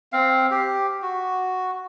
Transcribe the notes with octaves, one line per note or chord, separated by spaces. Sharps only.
C4 F5
G4
F#4